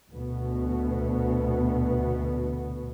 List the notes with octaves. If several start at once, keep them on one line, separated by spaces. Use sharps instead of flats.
D2 B2 B3